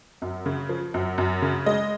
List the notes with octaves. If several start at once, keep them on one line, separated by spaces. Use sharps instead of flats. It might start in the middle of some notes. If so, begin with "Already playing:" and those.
F#2
C#3
F3
F#2
F#2
C#3
G#3 D#5